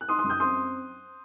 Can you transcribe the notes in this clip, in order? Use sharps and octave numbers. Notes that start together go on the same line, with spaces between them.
F#6
D#4 C6 D#6
C6 D#6
F#2
D#6 G6
C4 C6 D#6